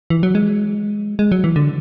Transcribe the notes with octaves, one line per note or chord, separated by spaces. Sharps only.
E3
F#3
G#3
G#3
F#3
E3
D3